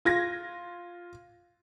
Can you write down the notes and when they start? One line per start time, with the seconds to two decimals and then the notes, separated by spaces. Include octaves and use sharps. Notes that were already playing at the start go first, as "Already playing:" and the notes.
0.05 F4 G#6 A#6